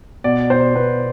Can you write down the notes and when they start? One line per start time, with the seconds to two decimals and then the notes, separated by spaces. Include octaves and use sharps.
0.24 B2 D5
0.49 B2 C5
0.75 B2 B4